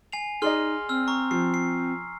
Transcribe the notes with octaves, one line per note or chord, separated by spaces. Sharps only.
G#5 C7 F7
D#4 G#4 D5 D#5 C6 F6
C4 E6 F6
A#5 C#6
F3 C7
C7